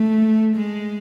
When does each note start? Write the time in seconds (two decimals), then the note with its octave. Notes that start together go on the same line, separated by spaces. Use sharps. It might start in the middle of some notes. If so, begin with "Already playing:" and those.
Already playing: A3
0.55 G#3